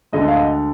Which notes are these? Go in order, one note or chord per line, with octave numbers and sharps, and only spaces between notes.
D2 D3 G#3 D#5
F5
D#5